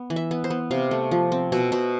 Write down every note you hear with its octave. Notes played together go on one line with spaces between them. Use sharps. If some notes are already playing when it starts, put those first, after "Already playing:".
Already playing: B3
E3
E5
B3
C5
B3
C3 F5
A3
F3
C4
B2 E5
B2 C5